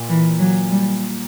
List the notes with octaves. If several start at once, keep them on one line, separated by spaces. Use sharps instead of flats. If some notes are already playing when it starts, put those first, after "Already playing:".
Already playing: A#2
E3
F#3
G3